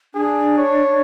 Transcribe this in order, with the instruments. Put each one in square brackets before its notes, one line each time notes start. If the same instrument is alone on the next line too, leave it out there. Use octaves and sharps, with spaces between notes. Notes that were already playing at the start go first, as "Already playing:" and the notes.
[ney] D4 [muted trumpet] G#4
[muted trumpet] C#5